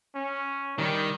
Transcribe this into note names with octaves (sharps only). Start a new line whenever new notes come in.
C#4
D#3 G3